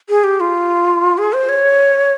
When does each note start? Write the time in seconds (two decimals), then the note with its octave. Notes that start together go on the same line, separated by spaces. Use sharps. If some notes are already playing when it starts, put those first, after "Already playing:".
0.09 G#4
0.24 G4
0.40 F4
1.18 G#4
1.33 C5
1.49 C#5